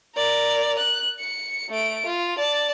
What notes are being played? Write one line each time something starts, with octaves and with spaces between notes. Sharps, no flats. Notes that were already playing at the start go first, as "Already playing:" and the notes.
A#4 D5
F#6
C#7
A3 D7
F4
D5 A5